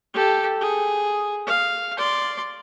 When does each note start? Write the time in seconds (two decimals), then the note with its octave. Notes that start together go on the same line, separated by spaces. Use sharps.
0.14 G4 A4
0.61 G#4
1.46 F5
1.98 D5 C6